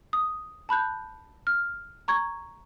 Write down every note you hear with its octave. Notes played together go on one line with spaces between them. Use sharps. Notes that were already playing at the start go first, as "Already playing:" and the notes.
D#6
A5 B5 F#6 G6
F6
A#5 C#6 G#6